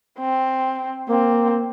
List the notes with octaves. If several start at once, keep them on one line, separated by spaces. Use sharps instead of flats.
C4
A#3 C4